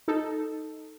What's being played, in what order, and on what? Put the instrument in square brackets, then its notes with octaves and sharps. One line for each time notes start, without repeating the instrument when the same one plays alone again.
[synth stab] D#4 A4